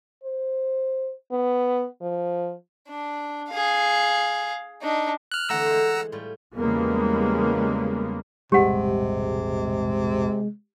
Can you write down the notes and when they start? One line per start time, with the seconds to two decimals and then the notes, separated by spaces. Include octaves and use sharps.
0.24 C5
1.32 B3
2.02 F3
2.88 D4
3.49 G#4 F5
4.82 D4 D#4
5.32 F6 F#6
5.49 D3 E3 A3 F#5 A#5 E6
5.66 G#3 C5
6.12 A2 G3 F4
6.56 E2 C#3 G3 G#3 A#3 B3
8.52 E1 A1 C3 G3 G#3 G4 F#5